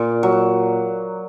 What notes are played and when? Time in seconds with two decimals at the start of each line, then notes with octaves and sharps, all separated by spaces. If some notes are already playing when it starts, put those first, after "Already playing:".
Already playing: A#2 F4 D5
0.23 F#3